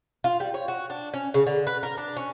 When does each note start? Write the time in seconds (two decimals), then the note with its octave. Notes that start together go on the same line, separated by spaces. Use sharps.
0.24 F4
0.40 G3
0.54 C#5
0.68 F#4
0.90 D4
1.14 C#4
1.34 C#3
1.47 D3
1.67 B4
1.83 A#4
1.98 D4
2.16 C#4